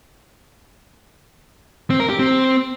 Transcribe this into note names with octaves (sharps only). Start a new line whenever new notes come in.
C4
A#4
G4
C4